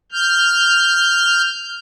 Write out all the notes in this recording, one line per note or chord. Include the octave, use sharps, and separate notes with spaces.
F6 G6